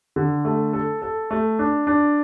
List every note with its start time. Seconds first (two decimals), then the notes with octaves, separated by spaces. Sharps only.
0.16 D3
0.45 A3
0.73 A4
1.02 A4
1.31 A3
1.59 D4
1.87 D4